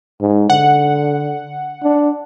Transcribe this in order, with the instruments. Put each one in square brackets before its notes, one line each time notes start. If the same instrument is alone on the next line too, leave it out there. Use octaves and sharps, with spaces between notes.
[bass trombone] G#2
[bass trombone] D3 [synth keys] F#5
[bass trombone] D4